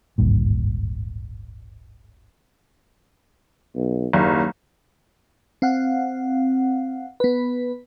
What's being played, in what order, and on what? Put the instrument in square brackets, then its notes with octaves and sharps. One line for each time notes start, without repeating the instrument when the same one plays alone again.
[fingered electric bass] D1 G#1 G2 A#2
[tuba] B1
[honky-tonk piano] F#1 [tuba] D#2
[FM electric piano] C4 F5 F#5
B3 B4